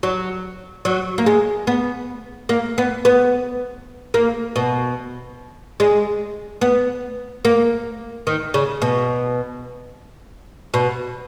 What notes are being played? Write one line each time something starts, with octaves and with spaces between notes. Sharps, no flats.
F#3
F#3
A#3
G#3
B3
A#3
B3
B3
A#3
B2
G#3
B3
A#3
D#3
C#3
B2
B2